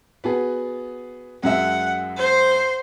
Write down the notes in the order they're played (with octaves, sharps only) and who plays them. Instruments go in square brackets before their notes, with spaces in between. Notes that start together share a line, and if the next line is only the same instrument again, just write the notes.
[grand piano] B3 F#4 G#4
[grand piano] F#2 G#3 E5 [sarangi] F#5
[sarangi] C5